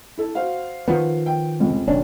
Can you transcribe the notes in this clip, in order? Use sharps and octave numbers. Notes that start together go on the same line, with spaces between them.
E4 A4
F#4 C5 F5
D#3 F3 B3
G5
F1 C#2
F#1 B1 D#3 C#4 D4